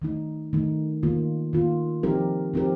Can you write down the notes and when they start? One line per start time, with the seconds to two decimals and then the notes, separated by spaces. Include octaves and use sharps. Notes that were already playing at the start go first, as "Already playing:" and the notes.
0.02 D#3 A3 D#4
0.53 D#3 A3 D#4
1.03 D#3 A#3 F4
1.53 D#3 A#3 F4
2.03 F3 C4 D#4 G4 A#4
2.54 F3 C4 D#4 G4 A#4